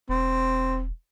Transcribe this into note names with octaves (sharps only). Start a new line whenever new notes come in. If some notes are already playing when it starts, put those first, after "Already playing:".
E1 C4